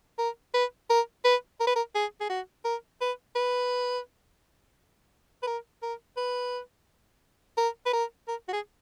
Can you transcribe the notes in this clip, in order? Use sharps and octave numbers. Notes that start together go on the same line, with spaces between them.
A#4
B4
A#4
B4
A#4
B4
A#4
G#4
G#4
F#4
A#4
B4
B4
B4
A#4
A#4
B4
A#4
B4
A#4
A#4
F#4
G#4